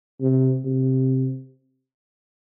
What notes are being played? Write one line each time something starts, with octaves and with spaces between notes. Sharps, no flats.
C3
C3